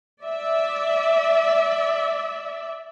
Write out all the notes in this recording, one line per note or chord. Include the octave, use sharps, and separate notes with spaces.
D5 E5